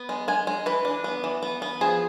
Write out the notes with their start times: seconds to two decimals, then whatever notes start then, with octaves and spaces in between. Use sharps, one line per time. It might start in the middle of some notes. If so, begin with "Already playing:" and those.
Already playing: B3
0.09 G#3
0.28 G#3 G#5
0.47 G#3
0.66 E3 B4
0.85 D4
1.04 B3
1.24 E3
1.43 B3
1.62 B3
1.81 F3 G#4